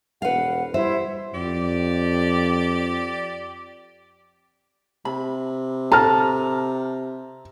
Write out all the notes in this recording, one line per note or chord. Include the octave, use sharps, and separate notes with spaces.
E1 B4 F5 F#5
G3 E4 C5 E5 C6
F2 G4 D5
C3 B5
A4 A#5 F6